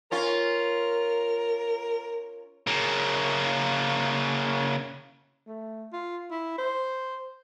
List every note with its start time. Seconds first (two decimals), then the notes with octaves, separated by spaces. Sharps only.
0.11 C#4 F4 A#4
2.67 C#3 A#3
5.47 A3
5.93 F4
6.31 E4
6.58 C5